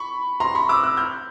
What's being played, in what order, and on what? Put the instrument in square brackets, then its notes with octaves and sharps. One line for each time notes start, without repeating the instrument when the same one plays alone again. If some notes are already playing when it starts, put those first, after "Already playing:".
Already playing: [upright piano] B5 C#6
A#5 C6
B5 C#6
D6 E6
E6 F#6
F6 G6